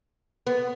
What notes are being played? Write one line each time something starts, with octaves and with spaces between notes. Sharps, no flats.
B3